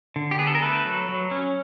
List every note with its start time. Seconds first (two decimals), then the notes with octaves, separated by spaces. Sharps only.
0.16 D3
0.31 G4
0.39 B3 G#4
0.47 A4
0.55 A#4
0.62 A3 A4 B4
0.86 F#3
1.09 F#3
1.31 C#4